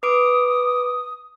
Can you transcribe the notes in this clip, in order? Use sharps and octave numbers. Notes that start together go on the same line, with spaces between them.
B4 D6 D#6 D7